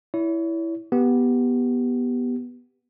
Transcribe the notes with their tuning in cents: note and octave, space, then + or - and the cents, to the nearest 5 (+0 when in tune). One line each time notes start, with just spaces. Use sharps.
E4 +0 C#5 +40
B3 -10 G4 +0